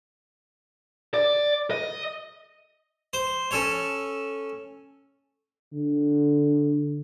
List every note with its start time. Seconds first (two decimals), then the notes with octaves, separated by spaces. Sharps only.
1.14 D5
1.71 D#5
3.13 C5
3.51 C#4 A4 C#5
5.73 D3